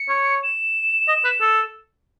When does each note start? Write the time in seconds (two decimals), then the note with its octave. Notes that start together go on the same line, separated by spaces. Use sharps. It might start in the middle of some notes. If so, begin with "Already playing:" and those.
Already playing: C#7
0.09 C#5
0.43 E7
1.08 D#5
1.24 B4
1.41 A4